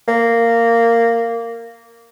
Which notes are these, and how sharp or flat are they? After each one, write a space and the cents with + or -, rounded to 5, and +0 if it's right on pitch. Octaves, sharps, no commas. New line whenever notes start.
A#3 -10